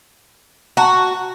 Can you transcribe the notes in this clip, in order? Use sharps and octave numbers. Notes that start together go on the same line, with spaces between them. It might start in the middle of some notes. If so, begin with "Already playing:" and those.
F#4 F#5 A5 A#5